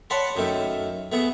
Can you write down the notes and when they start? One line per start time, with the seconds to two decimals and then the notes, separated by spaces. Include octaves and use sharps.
0.10 C#5 D5 F#5 A5 B5 C6
0.35 F#2 D#3 A3
1.12 A3 B3 G#4